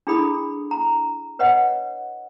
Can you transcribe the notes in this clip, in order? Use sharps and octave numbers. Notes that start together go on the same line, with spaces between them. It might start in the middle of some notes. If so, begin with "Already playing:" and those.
D4 E4 G#4 A4 B5 D#6
A#5
B4 C#5 D#5 F#5